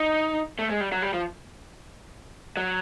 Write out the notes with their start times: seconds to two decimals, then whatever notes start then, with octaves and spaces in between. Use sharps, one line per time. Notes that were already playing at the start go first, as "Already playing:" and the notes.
Already playing: D#4
0.59 A3
0.70 G#3
0.81 G3
0.92 F#3
1.02 G3
1.14 F3
2.57 F#3